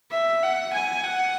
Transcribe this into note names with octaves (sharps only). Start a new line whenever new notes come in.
E5
F#5
G#5
F#5